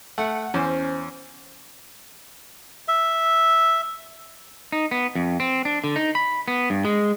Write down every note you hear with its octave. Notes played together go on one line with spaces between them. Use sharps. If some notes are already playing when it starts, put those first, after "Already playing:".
A3 F#5
E2 C#4 C5
E5
D#4
B3
F2
C4
D4
D3
D#4
B5
B3
G2
G#3